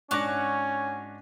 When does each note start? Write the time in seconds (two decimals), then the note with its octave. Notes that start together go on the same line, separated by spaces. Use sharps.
0.11 G#2 C#4 D4 F#4 C#5 D6 A#6